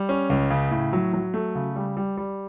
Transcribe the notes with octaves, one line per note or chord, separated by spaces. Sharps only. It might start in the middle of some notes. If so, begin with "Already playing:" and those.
Already playing: G3
C#4
C#2
C#3
A2
F#3
F#3
A3
C#3
G3
G3
G3